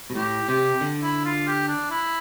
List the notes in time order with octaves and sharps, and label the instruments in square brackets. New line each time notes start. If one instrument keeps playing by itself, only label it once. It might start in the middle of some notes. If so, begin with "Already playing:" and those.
[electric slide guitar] B2
[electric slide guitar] A2 [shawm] G4
[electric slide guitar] C3 [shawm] G4
[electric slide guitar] D3
[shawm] E4
F4
G4
D4
E4